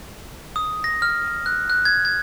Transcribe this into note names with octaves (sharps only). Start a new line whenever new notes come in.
D#6
A#6
F6
F#6
F#6
G#6
G#6